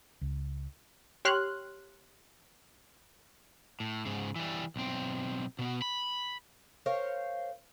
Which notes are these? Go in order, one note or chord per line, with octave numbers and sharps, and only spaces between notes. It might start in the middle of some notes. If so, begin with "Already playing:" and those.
C#2
G4 C#5 C6 F6 F#6
A2
G#2 C#3
E3 G3
B1 C4
B2 B3
B5
A#4 C5 C#5 F5